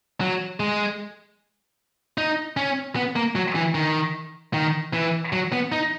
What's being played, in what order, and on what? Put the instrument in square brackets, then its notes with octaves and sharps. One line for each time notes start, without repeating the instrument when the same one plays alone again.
[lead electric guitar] F#3
G#3
D#4
C#4
B3
A#3
F#3
E3
D#3
D#3
E3
F#3
B3
D#4